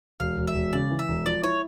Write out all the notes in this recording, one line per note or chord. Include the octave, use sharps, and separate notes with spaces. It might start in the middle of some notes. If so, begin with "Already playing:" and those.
E1 F5
E1
E5
E1
C#3 D5
E3
E5
E1
F3 D5
E4 C#5